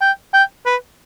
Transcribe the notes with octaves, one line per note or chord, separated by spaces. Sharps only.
G5
G5
B4